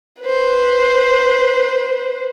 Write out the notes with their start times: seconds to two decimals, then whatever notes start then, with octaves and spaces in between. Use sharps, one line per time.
0.22 B4 C5